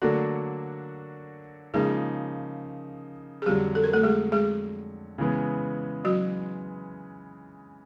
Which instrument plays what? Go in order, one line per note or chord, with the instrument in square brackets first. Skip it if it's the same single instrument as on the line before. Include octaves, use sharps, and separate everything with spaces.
[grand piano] D3 F#3 A#3 D4 F#4 [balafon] A3 A4
[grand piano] C#3 F3 A#3 D#4 [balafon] G#3 G#4
[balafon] G#4
[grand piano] F2 D3 F#3 [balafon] G3 G4
[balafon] A4
A#4
A3 A4
G#3 G#4
G#3 G#4
[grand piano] C#3 E3 G#3 B3
[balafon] F#3 F#4